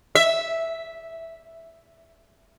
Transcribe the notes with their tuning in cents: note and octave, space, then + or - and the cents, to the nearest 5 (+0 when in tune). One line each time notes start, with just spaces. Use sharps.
E5 -5